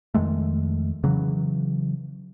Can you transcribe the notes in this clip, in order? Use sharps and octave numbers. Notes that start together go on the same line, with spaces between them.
F2 D#3 G#3 A3
C#3 E3 F#3